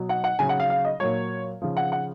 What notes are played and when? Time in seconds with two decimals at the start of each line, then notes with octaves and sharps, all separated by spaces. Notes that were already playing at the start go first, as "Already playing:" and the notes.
Already playing: B2 F#3
0.09 F#5
0.24 F#5
0.39 C#3 F#3 G#5
0.49 F#5
0.60 F5
0.70 F5
0.85 D#5
1.00 A#2 F#3 C#5
1.62 C#3 F3
1.77 F#5
1.92 F#5